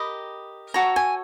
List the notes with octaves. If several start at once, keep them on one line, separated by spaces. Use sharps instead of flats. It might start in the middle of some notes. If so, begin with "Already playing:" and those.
Already playing: G4 A#4 D#5 B5
F#4 A4 C#5 A#5
G#5